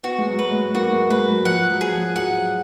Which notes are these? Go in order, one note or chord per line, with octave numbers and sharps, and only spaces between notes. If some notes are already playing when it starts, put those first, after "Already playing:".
B3 F#4
G#3
F#3
B4
G#3
A#3 F#4
G#3
G#3 B4
F#3
F3 F#5
F#3
G#4
F3
F#3 F#5